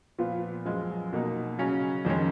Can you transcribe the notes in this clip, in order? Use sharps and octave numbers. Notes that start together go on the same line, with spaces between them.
A#2 F3 B3 F4
F#2 F3 G#3
B2 A#3 D#4
C#3 F#3 C#4
F2 D#3 G#3 C#4